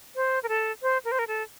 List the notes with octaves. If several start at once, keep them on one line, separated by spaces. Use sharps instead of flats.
C5
A#4
A4
C5
A#4
C5
A#4
A4